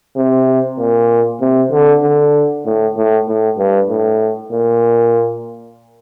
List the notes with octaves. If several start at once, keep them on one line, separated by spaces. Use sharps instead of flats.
C3
A#2
C3
D3
D3
A2
A2
A2
G2
A2
A#2